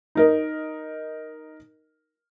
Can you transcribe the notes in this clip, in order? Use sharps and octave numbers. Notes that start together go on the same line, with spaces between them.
D#4 A#4 D#5